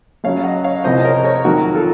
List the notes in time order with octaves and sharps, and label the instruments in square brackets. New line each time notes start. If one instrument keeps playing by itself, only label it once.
[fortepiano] F#2 C#3 F#3 C#5 F5
D#5 F#5
C#5 F5
C2 C3 F3 C5 D#5
D#5
A#4 C#5
A#4 C#5
F2 D#3 F#3 F#4 A#4
F4 A4